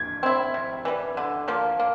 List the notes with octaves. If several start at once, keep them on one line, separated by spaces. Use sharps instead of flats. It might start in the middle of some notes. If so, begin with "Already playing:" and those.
Already playing: G#6
C4 E4
C3
E3 G3
D3
F3 A#3
A#3